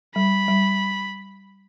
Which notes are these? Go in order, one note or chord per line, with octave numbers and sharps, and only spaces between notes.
G3 B5
G3